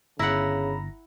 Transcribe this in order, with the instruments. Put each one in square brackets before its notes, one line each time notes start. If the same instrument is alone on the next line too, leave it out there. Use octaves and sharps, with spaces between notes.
[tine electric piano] G1 A#6 [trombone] C#3 [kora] E4 F#5 [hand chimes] A#5 B5